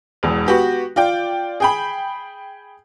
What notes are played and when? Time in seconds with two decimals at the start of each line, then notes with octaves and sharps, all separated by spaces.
0.23 E1 E2
0.46 B3 F#4 G4 B4
0.96 F4 D5 G5
1.60 G#4 G5 B5